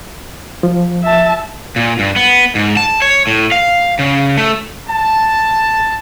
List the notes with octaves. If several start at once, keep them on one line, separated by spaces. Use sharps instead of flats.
F3
E5 A5
A#2
G2
B3
G#2
A5
C#5
A2
F5
C#3
A3
A5